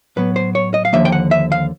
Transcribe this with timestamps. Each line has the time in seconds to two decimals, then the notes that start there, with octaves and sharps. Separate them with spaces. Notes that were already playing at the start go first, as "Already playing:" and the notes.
0.16 A2 F#3 B3 B4
0.36 C5
0.55 C#5
0.74 D#5
0.85 F5
0.93 D#2 D3 F3 A#3 E5
1.05 G5
1.12 F#5
1.31 E5
1.52 F5